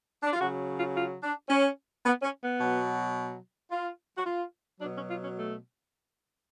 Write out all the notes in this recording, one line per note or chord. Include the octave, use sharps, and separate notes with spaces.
D4
F4
C#3 F#3 F#4
F4
F4
D4
C#4
B3
C#4
B3
B2 F#3
F4
F#4
F4
B2 F#3 D4
C#4
F4
C#4
A3